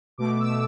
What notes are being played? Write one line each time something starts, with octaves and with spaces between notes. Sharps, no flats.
B2 A3 D6
E6